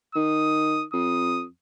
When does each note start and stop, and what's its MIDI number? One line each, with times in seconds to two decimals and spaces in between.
0.15 0.84 51
0.15 0.85 87
0.93 1.45 41
0.93 1.45 87